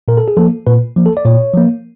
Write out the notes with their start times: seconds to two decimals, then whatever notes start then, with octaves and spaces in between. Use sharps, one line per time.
0.08 A#2 A#4
0.17 A4
0.28 G#4
0.37 F3 A#3 A4
0.67 A#2 B4
0.96 F3 A#3
1.06 A4
1.17 D5
1.25 A#2 C#5
1.54 F3 A#3